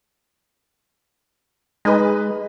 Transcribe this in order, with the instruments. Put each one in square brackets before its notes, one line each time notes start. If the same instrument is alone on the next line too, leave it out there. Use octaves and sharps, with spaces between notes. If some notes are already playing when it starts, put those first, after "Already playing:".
[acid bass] G#3 [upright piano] D#4 B4